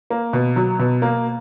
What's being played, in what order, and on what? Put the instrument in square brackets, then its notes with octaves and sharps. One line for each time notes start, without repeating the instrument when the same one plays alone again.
[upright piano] A#3
B2
F#3
B2
A#3